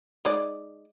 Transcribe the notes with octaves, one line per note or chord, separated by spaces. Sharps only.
G#3 D#4 D5